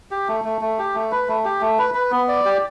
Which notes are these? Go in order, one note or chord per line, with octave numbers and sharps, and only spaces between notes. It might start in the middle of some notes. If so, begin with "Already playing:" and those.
G4
A3
A3
A3
G4
A3
B4
A3
G4
A3
B4
B4
B3
D5
G4